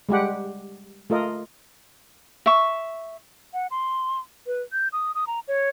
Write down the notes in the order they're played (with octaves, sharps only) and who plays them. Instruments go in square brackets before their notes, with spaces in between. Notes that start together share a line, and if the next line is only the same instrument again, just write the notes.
[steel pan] G3 G#3 G4 F#5
A3 F4 A#4 D#5
[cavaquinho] E5 C#6
[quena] F#5
C6
B4
G6
D#6
D#6
A#5
C#5